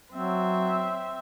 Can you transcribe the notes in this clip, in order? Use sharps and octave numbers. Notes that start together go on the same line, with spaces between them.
F#3 C4 E5